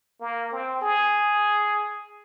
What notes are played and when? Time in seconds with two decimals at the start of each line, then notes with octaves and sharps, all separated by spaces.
0.21 A#3
0.52 C4
0.81 G#4